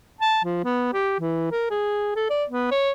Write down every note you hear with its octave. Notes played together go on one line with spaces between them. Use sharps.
A5
F3
B3
G4
E3
A#4
G#4
A4
D5
B3
C#5